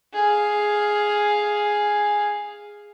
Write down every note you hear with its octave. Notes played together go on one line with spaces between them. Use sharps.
G#4 F5